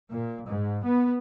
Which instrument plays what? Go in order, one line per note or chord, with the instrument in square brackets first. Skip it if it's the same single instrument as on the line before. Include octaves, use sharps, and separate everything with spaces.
[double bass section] A#2
G#2
B3